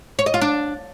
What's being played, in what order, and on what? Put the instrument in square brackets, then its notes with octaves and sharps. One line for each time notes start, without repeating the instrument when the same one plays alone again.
[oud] C#5
D#5
F4
D4